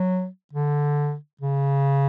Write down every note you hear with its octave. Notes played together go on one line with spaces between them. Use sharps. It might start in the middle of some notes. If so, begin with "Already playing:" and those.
Already playing: F#3
D3
C#3